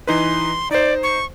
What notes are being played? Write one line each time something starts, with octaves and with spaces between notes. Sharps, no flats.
E3 D#4 B4 C6
D#4 C5 D5
C#6